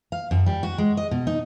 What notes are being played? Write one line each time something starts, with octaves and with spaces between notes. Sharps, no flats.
F5
F#2
G3
F#4
G#3
D#5
B2
D#4